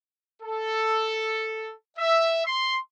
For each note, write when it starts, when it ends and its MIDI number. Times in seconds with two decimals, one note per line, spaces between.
0.42 1.73 69
1.98 2.42 76
2.46 2.77 84